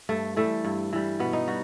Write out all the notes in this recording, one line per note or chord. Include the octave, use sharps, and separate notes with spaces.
G2 A3
E3 G3 A3
G2
E3 G3
B2 B3
D#4
G3 F#4